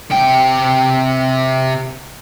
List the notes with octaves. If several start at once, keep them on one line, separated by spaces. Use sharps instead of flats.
C3 G5